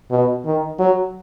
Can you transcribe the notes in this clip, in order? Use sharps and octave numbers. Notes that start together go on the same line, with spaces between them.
B2
D#3
F#3